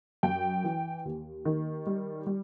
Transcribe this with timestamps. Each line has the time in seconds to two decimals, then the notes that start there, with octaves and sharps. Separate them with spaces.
0.23 F#2 G5
0.64 E3
1.05 D#2
1.45 D#3
1.87 G3
2.26 G3